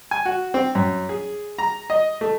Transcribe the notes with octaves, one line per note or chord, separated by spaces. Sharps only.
G#5
F#4
C4
F#2
G#4
A#5
D#5
A3